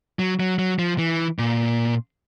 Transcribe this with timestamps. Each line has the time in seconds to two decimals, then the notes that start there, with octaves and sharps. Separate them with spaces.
0.19 F#3
0.40 F#3
0.59 F#3
0.79 F3
0.98 E3
1.39 A#2